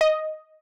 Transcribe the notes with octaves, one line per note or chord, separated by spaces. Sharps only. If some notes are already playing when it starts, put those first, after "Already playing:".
D#5